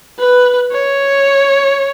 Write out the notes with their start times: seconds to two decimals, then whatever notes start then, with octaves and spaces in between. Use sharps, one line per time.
0.19 B4
0.72 C#5